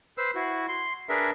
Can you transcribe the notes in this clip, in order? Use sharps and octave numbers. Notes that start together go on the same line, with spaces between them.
B4 C5 E6
E4 F#4
C6
D4 G#4 A#4 B4 E5